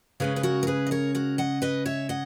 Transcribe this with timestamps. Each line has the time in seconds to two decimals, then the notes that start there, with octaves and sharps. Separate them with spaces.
0.20 C#3 G#3 C#4 G#4 B4
0.36 B4
0.43 F#4 A#4
0.63 A#4
0.67 G#4 B4
0.87 D#5
0.91 A#4 C#5
1.15 F#4 A#4
1.38 D#5 F#5
1.62 B4 D#5
1.86 C#5 E5
2.09 D#5 F#5